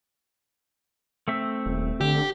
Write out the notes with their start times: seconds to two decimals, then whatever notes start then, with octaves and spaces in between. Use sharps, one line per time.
1.28 A3 C4 E5
1.66 D#1
2.01 D3 G4